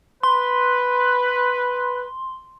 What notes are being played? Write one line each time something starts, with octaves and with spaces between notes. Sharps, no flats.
B4 C6